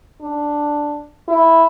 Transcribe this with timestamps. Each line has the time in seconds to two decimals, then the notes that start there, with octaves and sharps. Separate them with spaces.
0.22 D4
1.28 E4